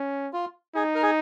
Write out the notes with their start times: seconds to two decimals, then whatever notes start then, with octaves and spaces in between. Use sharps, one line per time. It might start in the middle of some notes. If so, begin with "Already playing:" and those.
Already playing: C#4
0.33 F4
0.75 D#4 G#4
0.95 A#4
1.02 G#4